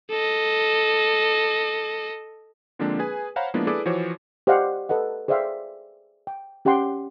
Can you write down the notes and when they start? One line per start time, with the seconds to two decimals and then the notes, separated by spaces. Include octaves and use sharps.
0.10 A4 D#5
2.79 D3 F3 G#3 A#3 C4 D4
2.99 G#4 B4 G#5
3.36 C5 C#5 F5 F#5 A#5 B5
3.54 F3 G#3 A#3 B3 D4 E4
3.67 E4 G#4 A4 B4 D5 D6
3.85 E3 F3 F#4 C5 C#5 D6
4.47 G4 C5 D5 D#5 F5 F#5
4.89 A4 B4 D#5 F#5
5.28 G#4 C5 D5 E5 F5 G5
6.27 G5
6.65 C#4 G4 F#5 G5 C6